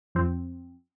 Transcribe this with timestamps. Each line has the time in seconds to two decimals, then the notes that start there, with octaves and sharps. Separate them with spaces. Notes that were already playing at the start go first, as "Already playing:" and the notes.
0.15 F2 F3 C4